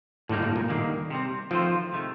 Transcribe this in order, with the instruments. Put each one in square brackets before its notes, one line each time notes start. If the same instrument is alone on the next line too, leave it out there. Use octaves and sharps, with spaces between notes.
[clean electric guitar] D#2 D3 G3 A#3 D#4 [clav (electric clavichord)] A2
[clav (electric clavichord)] A2
A#2
[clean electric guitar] D#2 D3 G3 A#3 [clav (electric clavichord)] D#3
[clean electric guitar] C3 G3 C4
[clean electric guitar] D#3 A3 C4 F4 C5 [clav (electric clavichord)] F3
[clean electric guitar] C3 D#3 A3